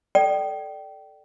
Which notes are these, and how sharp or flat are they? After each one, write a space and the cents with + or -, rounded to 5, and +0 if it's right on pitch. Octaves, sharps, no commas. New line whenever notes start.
A4 +0 D5 +25 G5 -25